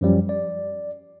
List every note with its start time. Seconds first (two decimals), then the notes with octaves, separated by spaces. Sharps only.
0.01 F#2 F3 G3 C#4
0.29 D5